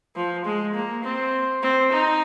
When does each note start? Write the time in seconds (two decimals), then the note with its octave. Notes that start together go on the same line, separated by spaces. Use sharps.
0.16 F3
0.46 G#3
0.75 A#3
1.04 C4
1.63 C4
1.93 D#4